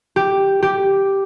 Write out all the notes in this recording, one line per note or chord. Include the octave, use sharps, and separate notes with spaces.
G4
G4